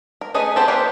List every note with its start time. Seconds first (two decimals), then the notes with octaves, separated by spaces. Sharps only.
0.21 A#4
0.34 A3 C#4 G#4 B4 D#5
0.56 B3 C4 G4 A4 C5
0.68 A#3 F4 G4 B4 C#5